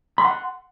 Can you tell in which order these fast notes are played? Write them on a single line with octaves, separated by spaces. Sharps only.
B5 C6 F#5